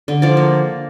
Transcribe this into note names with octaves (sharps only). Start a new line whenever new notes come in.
D3
F3 D5
A#3